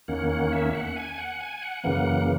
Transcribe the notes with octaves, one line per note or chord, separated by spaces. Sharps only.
E2 D#3 A#3 C#4 F#5
F#5
E5
F#5
G#5
F#5
G#5
F#5
F#2 C#3 E3 A#3 F#5